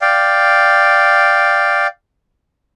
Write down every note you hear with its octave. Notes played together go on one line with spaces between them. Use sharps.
D5 F5 G5